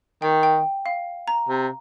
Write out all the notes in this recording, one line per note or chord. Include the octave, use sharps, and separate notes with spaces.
D#3 G5
G5
F5
A#5
C3